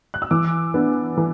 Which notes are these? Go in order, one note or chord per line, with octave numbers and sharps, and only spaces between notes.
F#6
E6
E3 D6
B3 D4
E3